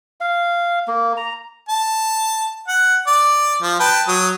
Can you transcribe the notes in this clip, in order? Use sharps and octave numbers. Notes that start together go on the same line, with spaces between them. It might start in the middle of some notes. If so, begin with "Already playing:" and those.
F5
A#3
A#5
A5
F#5
D5
F3
B4 G5 A5
F#3 D#6